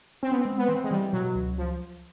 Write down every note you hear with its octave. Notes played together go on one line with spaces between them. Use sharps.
C4 C#4
B3
G#3 C4
B3
E3 C4
G#3
E3 G3
B2 F#3
C#2
F3